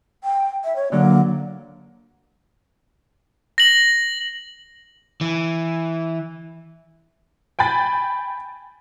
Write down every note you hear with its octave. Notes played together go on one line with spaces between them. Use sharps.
G5
E5
C#5
D3 F#3 A#3
A#6 F#7
E3
G5 G#5 B5 A6